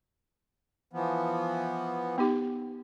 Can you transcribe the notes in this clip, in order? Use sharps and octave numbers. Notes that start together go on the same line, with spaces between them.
E3 F3 B3
B3 D#4 G4